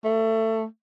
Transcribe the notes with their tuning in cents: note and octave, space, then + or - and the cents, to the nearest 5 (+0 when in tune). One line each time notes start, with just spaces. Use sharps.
A3 +20